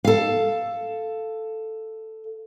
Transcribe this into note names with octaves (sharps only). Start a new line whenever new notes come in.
A4 F5